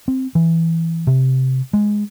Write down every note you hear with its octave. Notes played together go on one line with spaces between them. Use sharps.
C4
E3
C3
G#3